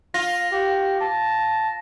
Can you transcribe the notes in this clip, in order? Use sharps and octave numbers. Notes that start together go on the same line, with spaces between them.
F4 A#6
G4
A5